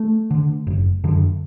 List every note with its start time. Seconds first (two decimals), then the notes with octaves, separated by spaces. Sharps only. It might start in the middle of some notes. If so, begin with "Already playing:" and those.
Already playing: A3
0.31 D3
0.67 F#1
1.04 F#2 D3